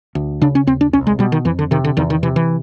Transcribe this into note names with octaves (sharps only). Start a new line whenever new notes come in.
D2
C#3 D4
C#4
D#2 C4
D4
C2 C#4
G#3
B2 G3
D#3
F2 E3
D3
C3 D#3
D3
E2 D#3
D#3
C3 E3
E3